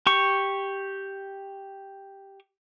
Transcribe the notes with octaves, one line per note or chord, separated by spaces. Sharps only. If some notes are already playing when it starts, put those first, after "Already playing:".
G4 C#6